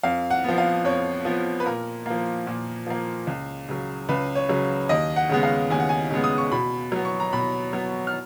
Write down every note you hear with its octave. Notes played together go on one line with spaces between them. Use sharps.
F2 F5
F#5
F3 B3
F5
F2 C#5
F3 B3
B4
A#2 A#4
F3 A#3
A#2
F3 A#3
C#2
C#3 F#3
C#2 B4
C#5
C#3 F#3
D#2 D#5
F#5
C#3 G#3 B3 F#5
F5
D#2 G#5
F#5
G#5
C#3 G#3 B3
D#6
C#6
B2 B5
F#3 B3
C#6
A#5
B2 B5
F#3 B3
F6